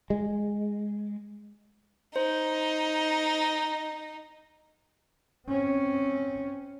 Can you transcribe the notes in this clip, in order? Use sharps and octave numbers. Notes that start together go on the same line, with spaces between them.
G#3
D#4 C5
C4 C#4